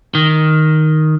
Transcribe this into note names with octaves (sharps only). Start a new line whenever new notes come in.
D#3